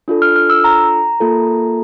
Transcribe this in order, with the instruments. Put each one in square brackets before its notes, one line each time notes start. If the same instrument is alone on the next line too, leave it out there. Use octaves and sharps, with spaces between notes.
[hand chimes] D4 F4 A4
F6
F6
E6
A#5
A#3 F4 A4